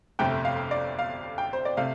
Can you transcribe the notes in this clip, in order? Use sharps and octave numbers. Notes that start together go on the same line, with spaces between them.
G1 F2 C3 A3 G5
F5
D5
F5
G5
C5
D5
C3 A3 F5